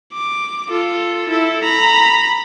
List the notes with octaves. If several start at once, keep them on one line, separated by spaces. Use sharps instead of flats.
D6
F4 A4
E4 A4
A#5 B5